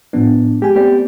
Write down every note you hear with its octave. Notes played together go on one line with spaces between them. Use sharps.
A2 F3 B3 D4
G#3 G4 G#5
A3 B3 C4 G4 B4 D5